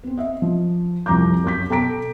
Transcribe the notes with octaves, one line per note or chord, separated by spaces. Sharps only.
B3 C4
D#5 E5
F3
C2 F2 F3 A#5 D6 G6
F#2 F#3 G6 B6
B2 A4 G5 A#5 B6 D7